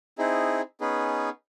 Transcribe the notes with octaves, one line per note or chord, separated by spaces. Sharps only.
C4 D#4 E4 G#4
B3 C#4 D#4 G#4 B4